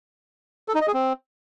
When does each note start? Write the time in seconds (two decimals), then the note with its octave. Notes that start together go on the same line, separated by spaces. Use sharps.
0.68 A4
0.75 D#4
0.81 D#5
0.88 G#4
0.94 C4